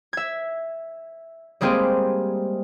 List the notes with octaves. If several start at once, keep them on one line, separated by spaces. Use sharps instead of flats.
E5 G#6
G3 G#3 A#3 C4 G4 G#4